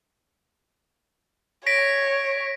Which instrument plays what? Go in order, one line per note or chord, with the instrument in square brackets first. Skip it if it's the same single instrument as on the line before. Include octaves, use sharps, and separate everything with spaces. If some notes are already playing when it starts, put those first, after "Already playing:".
[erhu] C#5 [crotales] A#6 B6 D7